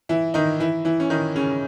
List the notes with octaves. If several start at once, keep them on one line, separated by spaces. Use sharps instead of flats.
E3 E4
D#3 D#4
E3 E4
E3 E4
C#4
D#3 D#4
C#3 C#4